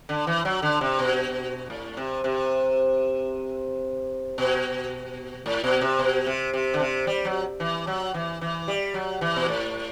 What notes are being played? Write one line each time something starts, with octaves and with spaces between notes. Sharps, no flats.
D3
E3
F#3
D3
C3
B2
A2
C3
C3
B2
A2
B2
C3
B2
C3
C3
D3
C3
G3
F#3
E3
F#3
E3
E3
G3
F#3
E3
B2
A2